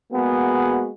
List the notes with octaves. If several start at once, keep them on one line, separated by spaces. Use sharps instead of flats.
G#3 A#3 B3 F#4 G#4